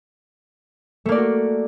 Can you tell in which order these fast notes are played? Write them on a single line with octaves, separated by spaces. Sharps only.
A3 A#3 D5 A#4 F#4